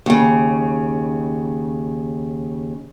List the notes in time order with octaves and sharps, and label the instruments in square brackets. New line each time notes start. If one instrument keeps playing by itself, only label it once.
[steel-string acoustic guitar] D#2 C#3